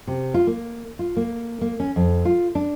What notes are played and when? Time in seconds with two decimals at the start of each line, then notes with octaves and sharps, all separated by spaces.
0.07 C3
0.34 F4
0.47 A#3
0.99 F4
1.17 A#3
1.61 A#3
1.80 C#4
1.96 F2
2.25 F4
2.55 D4